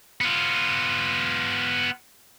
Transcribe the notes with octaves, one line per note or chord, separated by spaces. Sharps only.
B3 F4